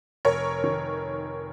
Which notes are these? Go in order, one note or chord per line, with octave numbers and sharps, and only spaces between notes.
F1 A#4 C#5
D#3